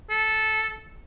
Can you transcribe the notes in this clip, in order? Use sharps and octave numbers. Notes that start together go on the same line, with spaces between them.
A4